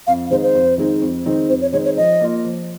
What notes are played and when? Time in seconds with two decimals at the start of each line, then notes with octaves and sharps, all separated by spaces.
0.07 F2 F5
0.30 D#3 G#3 C4 D#4 C5
0.42 C5
0.55 F2
0.78 D#3 G#3 C4 D#4
1.01 F2
1.26 D#3 G#3 C4 D#4
1.49 F2 C5
1.61 C#5
1.72 D#3 G#3 C4 D#4 C#5
1.85 C#5
1.97 F3 D#5
2.20 A#3 F4
2.45 F3